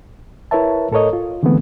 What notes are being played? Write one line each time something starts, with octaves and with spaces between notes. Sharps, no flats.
E4 A#4 B4 C#5 E5 A5
A2 A4 A#4 C#5 D#5
F4
D3 E3 G#3 A3 B3 C4